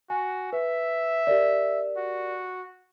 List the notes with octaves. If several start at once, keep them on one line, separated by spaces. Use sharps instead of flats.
F#4 G#5
B4 E5
G4 A#4 D5
F#4